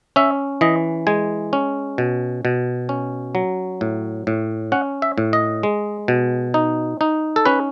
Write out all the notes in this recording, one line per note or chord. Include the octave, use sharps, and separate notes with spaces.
C#4 E5
E3 D#5
G#3 G#5
C#4
B2
B2
C#4
F#3
A2
A2
C#4 F#5
E5
A2
D#5
G#3
B2
D#4
D#4
A4
C#4 B4